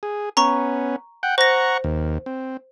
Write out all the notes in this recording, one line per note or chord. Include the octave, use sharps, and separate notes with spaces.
G#4
B3 C#4 A#5 C#6
F#5 G5
C5 F#5 A#5 C#6 A#6
D#2
C4